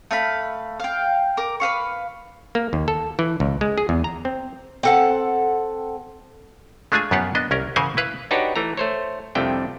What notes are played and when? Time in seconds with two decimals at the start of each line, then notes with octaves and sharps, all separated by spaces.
0.11 A3 F5 B5
0.80 F5 G5
1.37 A#4 D6
1.60 B4 C5 F5 C#6
2.55 A#3
2.73 D#2
2.88 A4
3.19 E3
3.40 C#2
3.61 G#3
3.78 G#4
3.89 E2
4.04 A#5
4.25 C4
4.83 C4 A4 F#5
6.92 G#3 A3 D4 F4 G#4 G#5
7.11 F#2 B3 F4 G4 F#5
7.35 B3 D4 D#5
7.51 C2 C#4 A#4
7.76 C#3 E3 A#4 C5 F#5 G#5
7.97 E4 B4 F5
8.31 D4 D#4 F#4 G4 B4 C#5
8.56 E3 A3 A#5
8.77 A3 C5 C#5
9.35 C2 F2 C3 A3 D4 G5